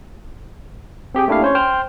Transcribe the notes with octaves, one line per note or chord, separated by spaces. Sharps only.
C4 G4 G#4 G5
A3 A#3 D4 E4 G4 F5
C#4 C5 C#5
C5 G5 F6